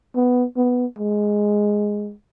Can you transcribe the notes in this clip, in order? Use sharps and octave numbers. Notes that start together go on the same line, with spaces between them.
B3
B3
G#3